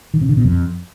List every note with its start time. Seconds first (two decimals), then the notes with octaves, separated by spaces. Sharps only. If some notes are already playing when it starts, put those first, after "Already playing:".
0.14 D#3
0.21 C3
0.29 D3
0.37 B2
0.45 F2